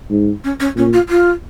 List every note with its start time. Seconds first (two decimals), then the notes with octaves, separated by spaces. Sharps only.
0.10 G#2
0.44 C#4
0.60 C#4
0.76 A#2 C#4
0.93 F4
1.09 F4